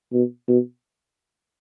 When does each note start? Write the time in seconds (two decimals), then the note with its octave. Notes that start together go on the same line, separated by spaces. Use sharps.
0.13 B2
0.48 B2